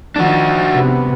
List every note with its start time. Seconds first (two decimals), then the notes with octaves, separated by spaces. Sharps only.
0.16 D#3 F3 D4 F#4
0.73 C3 B3